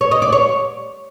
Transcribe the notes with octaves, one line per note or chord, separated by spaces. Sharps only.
C#5
D#5
D5
C#5